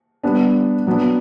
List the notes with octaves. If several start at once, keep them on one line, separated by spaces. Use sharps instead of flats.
G3 B3 D4
F#3 B3 D4